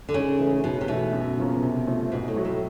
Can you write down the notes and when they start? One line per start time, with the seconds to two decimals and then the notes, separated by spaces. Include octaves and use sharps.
0.09 D3
0.14 G#2 C#3
0.39 E3 A3
0.64 G#2 B2
0.81 C3
0.88 B2 E3 A3
1.13 F#2
1.37 C#3 F3 A#3 C#4
1.62 C3
1.87 F3 A3
2.12 G#2 B2
2.28 A2
2.36 F#3 A3
2.45 A2